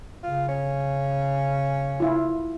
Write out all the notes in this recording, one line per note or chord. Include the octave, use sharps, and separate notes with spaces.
C#3 F4
C#4
E4 F4